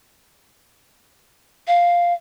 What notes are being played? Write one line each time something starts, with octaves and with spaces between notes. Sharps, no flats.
F5